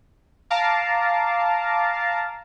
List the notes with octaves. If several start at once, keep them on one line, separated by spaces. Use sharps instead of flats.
F5 A5 A#5 D6